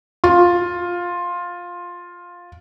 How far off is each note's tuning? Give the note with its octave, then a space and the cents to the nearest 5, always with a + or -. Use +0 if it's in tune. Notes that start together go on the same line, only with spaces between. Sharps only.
F4 +10